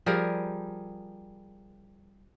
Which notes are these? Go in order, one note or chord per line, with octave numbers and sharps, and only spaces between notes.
F3 G3 G#4 A#4